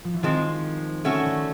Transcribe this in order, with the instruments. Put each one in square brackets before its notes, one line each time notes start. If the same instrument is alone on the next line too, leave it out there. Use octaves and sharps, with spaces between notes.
[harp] F3
E3
[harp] D#3 [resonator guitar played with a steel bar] F3 G#3 C4
[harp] D3 [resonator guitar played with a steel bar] A3 C#4 F#4 A4
[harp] D3